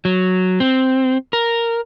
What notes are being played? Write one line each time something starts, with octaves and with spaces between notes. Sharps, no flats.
F#3
C4
A#4